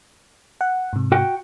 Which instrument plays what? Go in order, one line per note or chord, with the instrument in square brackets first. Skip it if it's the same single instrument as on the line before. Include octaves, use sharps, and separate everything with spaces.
[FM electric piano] F#5
G#2 C3
[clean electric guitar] F#4 F#5 G5